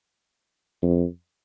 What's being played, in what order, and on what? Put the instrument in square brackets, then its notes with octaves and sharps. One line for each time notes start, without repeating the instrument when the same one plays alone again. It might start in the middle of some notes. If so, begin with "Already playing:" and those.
[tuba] F2